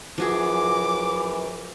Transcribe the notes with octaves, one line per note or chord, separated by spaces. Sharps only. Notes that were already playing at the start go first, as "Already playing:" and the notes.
F#2 E3 F3 F#4 G#4 D6